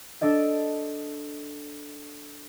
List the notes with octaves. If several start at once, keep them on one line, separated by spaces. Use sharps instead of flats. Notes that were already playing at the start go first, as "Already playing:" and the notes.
D4 A4 D5 D#5